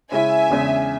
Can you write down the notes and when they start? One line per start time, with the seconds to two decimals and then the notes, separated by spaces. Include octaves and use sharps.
0.12 C#3 G#3 C#4 E4 E5 G#5
0.50 E2 C#3 G#3 D4